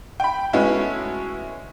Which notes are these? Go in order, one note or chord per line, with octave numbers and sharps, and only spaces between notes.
G5 B5
G#3 A3 B3 C#4 E4 F#4